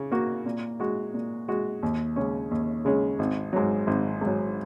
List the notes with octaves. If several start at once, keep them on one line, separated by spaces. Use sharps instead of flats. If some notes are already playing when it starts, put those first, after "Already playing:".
Already playing: C#3
A#3 F#4
A#2
G#3 F#4
A#2
G#3 F#4
D#2
C#3 G#3 C#4
D#2
C#3 G#3 C#4
G#1
G#2 F#3
G#1
G#2 F#3